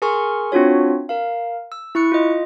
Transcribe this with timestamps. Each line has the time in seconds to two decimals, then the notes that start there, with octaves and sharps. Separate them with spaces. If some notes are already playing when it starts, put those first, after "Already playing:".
0.02 G#4 A#4 G#5 C6 C#6 F6
0.52 C4 D4 F4 F#4 C#5
1.09 A#4 F5
1.72 E6
1.95 E4 C#6 F#6 C#7
2.12 F4 D#5